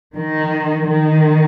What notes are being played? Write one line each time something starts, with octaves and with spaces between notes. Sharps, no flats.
D#3
D#3